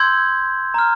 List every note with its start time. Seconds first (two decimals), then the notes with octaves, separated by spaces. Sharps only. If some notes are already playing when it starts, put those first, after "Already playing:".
Already playing: C6 E6 G6 G#6
0.74 A#5 F6